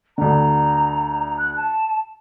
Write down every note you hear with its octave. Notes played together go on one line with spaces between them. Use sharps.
D2 D3 A#5
F#6
A5